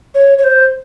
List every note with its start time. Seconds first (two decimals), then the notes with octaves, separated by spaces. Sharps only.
0.14 C#5
0.38 C#5
0.43 C5